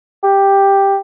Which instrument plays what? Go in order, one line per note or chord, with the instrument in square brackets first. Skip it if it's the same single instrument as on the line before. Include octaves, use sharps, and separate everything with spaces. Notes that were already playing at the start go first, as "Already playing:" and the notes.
[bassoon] G4